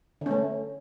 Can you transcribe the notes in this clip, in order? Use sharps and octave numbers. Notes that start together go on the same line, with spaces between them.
D3 A3 C#4